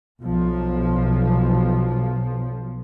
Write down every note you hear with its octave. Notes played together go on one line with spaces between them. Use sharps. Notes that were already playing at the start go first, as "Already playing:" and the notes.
B1 F3